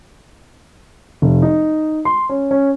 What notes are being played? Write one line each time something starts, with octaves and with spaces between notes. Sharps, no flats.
F1
D#4
C6
C#4
C#4